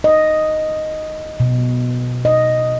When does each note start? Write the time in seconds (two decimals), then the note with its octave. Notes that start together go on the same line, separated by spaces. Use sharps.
0.04 D#5
1.40 B2
2.25 D#5